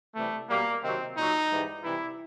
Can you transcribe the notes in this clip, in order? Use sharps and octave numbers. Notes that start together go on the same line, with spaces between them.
C3 E3 G3 A3
B2 G3 A#3
C3 D#3 F#3 C4
A#2 F#3 D#4
G#2 E3 G3
C3 E3 G3 E4